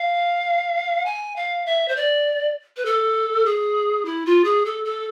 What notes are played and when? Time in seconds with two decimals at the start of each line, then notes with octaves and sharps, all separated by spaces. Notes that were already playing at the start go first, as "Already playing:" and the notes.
Already playing: F5
1.06 G#5
1.36 F5
1.66 E5
1.88 C5
1.97 D5
2.77 B4
2.85 A4
3.46 G#4
4.05 E4
4.26 F4
4.44 G#4
4.65 A4
4.85 A4